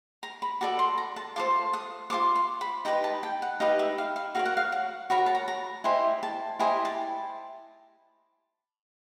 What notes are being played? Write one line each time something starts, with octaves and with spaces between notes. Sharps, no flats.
A#5
B5
F#4 A4 D5 D6
C6
A#5
A5
F4 A4 C5 D6
D#6
F4 A4 C5 D6
C6
B5
D#4 G4 B4 D#5 A#5
A5
G5
F#5
D#4 G4 B4 D#5 F5
E5
F5
F5
F#4 A#4 C#5 F5
F#5
F5
F#5
F#4 A#4 C#5 B5
A#5
A5
A#5
A#5
E4 G4 C5 D#5 G#5
A5
E4 G4 C5 D#5 G#5
A5